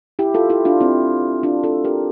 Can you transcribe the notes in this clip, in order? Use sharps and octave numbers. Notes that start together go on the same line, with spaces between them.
E4 G4
F4 A4
E4 G4
D4 F4
C4 E4
D4 F4
F4 A4
G4 A#4